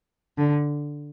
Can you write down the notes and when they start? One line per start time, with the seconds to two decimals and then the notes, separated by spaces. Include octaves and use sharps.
0.38 D3